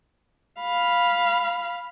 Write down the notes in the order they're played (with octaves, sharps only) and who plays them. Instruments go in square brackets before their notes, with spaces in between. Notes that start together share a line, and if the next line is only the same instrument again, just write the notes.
[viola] F5 B5